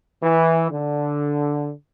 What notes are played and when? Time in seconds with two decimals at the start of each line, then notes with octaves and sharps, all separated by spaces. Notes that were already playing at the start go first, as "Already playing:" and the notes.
0.23 E3
0.71 D3